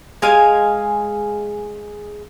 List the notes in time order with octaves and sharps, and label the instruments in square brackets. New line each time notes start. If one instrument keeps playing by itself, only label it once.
[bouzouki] G#3 F5 G#5